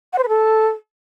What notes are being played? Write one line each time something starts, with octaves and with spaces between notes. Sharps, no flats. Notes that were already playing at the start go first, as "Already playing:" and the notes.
F#5
C5
B4
A4